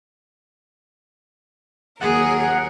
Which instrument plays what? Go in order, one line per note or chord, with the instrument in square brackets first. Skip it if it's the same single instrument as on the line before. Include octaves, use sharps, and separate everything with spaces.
[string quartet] D#2 F#3 A#4 [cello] G#4 [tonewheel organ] F#5